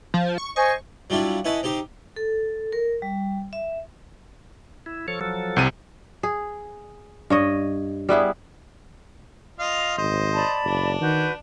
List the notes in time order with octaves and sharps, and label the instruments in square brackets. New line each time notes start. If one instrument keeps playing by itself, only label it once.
[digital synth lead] F3
C#6
[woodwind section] C5 D#5 G#5 [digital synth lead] C#6
[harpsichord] F#3 G3 D4 E4 F4
C#4 E4 B4 D#5 A5
C4 D#4 G4 C5
[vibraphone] A4
A#4
G3
E5
[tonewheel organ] E4
F3 A4 C#5
F3 F#3 A4
[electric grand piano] C2 C3 D#7
[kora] G#4
G2 C#5 D#5
G3 B3 E4 G#4
[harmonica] F4 D#5 F5
[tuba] G#1 [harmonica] C5 D#5
[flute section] D5 A5 B5
[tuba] F#1 [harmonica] D4
[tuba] D#3 [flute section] F#4 B4 G6